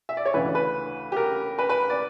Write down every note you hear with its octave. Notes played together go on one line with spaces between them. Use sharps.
E5
D5
C#5
D2 C#3 E3 B4
B4
G4
A#4
B4
B4
D5